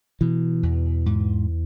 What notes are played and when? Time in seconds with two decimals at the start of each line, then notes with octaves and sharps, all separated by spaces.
0.21 B2 E3
0.63 E2
1.06 G#2